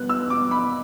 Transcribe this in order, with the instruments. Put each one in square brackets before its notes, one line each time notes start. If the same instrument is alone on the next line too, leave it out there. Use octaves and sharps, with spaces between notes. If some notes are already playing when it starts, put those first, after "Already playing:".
Already playing: [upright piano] B2 G3 B3 [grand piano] F#6
[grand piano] E6
[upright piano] B2 [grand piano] D6
[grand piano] B5